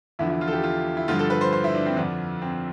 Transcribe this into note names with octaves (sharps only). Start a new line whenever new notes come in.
E2 D3 F3 E4
E4
F4
A4
G4
F4
E4
G2 D3 F3 F4
A4
B4
C5
C5
E4
D4
C4
F2 D3 F3 D4
C4